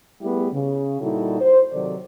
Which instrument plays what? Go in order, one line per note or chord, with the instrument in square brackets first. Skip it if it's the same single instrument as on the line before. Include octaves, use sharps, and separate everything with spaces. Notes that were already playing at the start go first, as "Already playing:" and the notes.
[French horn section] G3 A3 B3 E4 G4 G#4
C#3
A#2 G3 D#4 E4 F#4 A4
C5
C3 D#3 F#3 A4 D5